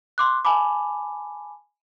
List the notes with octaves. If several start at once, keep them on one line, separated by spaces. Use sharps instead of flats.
C6 D6 F#6
G#5 A5 B5 D6